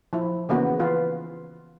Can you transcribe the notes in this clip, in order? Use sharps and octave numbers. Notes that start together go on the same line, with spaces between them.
F3 E4
C#3 E3 A#3 B3 F#4
E3 F4 B4